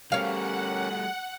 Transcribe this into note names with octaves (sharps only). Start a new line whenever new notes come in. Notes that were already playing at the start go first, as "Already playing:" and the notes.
G3 A3 C#4 G4 A#4 C#5 F5 F#5